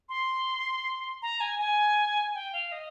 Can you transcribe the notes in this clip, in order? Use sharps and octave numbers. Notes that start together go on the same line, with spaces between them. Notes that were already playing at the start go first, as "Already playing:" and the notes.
C6
A#5
G#5
G#5
G5
F5
D#5